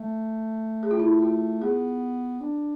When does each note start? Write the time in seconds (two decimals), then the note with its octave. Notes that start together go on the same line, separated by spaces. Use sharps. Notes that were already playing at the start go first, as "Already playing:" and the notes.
Already playing: A3
0.83 G#4
0.91 F4
1.00 E4
1.09 F4
1.22 F4
1.62 B3 G#4
2.40 D4